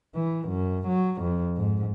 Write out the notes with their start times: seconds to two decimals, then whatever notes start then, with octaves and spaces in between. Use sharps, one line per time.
0.15 E3
0.49 F#2
0.88 F#3
1.22 F2
1.57 G#2